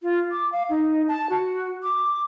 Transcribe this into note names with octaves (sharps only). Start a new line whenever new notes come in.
F4
D6
F5
D#4
A5
F#4
D6